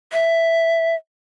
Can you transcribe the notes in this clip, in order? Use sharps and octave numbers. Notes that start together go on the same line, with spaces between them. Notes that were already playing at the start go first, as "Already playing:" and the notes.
E5